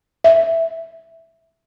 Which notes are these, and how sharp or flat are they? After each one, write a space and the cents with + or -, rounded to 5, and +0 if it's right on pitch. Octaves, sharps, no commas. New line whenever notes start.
E5 +0